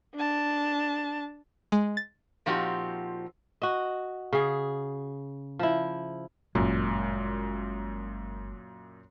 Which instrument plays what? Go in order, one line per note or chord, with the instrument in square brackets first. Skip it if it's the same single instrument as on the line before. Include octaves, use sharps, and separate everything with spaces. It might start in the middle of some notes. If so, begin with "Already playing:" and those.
[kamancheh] D4 A5
[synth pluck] G#3
A6
[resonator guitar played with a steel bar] A#2 F3 C4 D#4 F#4 G4
[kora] F#4 D#5
C#3 G#4
F3 E4
[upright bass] G1 G#3 [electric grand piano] F#2 A#2